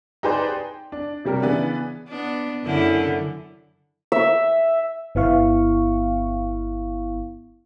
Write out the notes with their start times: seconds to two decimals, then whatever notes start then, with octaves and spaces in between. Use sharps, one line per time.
0.23 D#4 G4 G#4 B4 C5 D5
0.49 G5
0.92 D4
1.25 C3 F#3 G3 G4 A#4
1.42 C#3 E3 B3 D4
2.09 B3 D4
2.65 F#2 D3 E4
4.12 E5
5.15 G1 B3 E4 F5 C#6